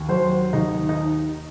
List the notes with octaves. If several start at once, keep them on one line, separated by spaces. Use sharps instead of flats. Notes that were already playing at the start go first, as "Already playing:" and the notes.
Already playing: D#2
F#3 C5
D#2 D#4
D#4